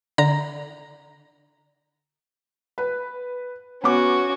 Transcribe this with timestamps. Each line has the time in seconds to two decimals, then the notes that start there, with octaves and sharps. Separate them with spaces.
0.18 D3 A#5
2.78 B4
3.84 B3 C#4 F#4 D6